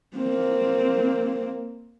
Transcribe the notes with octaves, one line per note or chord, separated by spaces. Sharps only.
A#3 C4